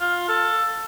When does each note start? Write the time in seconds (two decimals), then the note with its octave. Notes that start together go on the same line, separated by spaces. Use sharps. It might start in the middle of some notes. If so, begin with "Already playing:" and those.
0.01 F4
0.29 A4